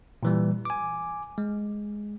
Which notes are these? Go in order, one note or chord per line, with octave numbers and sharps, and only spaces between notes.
A#2 E3 G3
G#5 D6
G#3